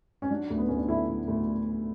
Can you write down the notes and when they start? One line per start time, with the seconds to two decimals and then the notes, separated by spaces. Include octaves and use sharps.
0.22 C#4
0.30 F#3 D4
0.50 D2
0.58 B3
0.68 D2 C#4
0.78 D4
0.88 D3 E4
1.08 F#3
1.28 D2